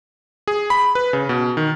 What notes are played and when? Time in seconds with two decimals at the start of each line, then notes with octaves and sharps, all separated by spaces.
0.48 G#4
0.70 B5
0.95 B4
1.13 C#3
1.29 B2
1.57 D#3